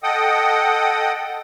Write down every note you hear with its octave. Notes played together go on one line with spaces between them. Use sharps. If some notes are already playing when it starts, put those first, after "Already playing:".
A4 D#5 F#5 G5 D#6